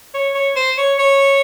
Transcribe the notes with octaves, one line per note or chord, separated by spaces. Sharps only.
C#5
C#5
C5
C#5
C#5